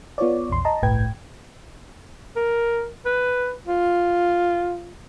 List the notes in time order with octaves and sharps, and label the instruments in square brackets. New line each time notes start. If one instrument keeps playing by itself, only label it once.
[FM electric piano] B3 F4 C#5 D5
A#1 E2 C6
D#5 A5 A#5
G1 C2 A2 B4 G5 G#6
[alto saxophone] A#4
B4
F4